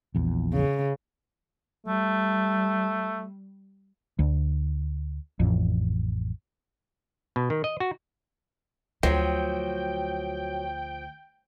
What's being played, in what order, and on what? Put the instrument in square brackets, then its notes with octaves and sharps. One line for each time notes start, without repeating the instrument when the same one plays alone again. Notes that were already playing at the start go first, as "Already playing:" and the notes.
[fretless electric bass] A#1 E2
[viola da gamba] C#3
[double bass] G3 [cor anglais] A3
[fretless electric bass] D2
A1 F2
[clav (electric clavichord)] B2
D#3
D#5
F#4
[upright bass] D2 [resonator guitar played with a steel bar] F3 [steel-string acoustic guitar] F#3 [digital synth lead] G5